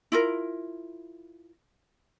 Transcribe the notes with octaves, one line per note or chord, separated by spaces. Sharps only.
E4 F4 A#4